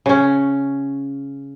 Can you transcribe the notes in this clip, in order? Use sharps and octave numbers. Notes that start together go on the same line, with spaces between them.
C#3 C#4